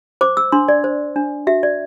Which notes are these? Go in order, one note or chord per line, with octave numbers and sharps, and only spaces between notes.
C5 D6
E6
D4 C6
D5
C5
D4
F#4 E5
D5